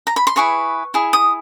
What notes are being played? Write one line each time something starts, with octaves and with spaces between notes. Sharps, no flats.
A#5
B5
C6
E4 G#4 B4 C#6
E4 G#4
D#6